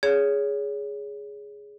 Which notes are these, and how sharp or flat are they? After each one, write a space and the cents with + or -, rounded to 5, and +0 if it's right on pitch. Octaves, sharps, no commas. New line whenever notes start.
G#4 +0 C#5 +25